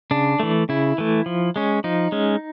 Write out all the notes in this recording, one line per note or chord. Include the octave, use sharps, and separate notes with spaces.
C#3 D4
E3 A3
C#3 E4
E3 A3
F3
G#3 C#4
F3 D#4
G#3 C#4